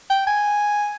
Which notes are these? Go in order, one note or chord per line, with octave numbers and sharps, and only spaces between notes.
G5
G#5